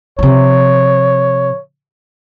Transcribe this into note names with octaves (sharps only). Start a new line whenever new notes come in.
C3 F3 C#5